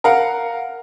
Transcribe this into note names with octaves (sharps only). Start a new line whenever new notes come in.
A#4 F5 F#5